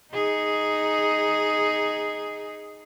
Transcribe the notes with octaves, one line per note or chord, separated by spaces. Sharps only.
D#4 G#4